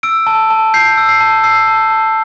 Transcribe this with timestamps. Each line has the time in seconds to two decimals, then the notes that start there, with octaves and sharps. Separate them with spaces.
0.03 E6 D7
0.27 A5
0.51 A5
0.74 G6 C7
0.98 E6
1.09 C7
1.20 A5
1.43 E6 C7
1.67 A5
1.90 A5